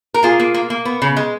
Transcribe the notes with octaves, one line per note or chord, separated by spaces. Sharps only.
A#4
A#3 F4 G#4
A#3
A#3
A#3
B3
C#3
G#3